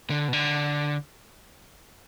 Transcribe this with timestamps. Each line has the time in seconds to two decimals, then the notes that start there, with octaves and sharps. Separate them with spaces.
0.10 D3
0.28 B2
0.33 D3